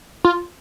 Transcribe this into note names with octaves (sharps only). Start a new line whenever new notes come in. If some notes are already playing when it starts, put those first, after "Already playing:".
F4